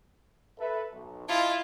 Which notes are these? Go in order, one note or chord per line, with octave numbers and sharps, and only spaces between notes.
A4 B4 E5
B1
E4 F4 D#5 A5